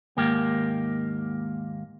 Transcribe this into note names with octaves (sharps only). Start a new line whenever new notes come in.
D#2 G#2 A#3 G4